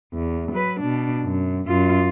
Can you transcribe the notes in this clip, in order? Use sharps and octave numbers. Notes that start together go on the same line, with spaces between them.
E2
F#3 B4
B2 D4
F#2
F#2 F4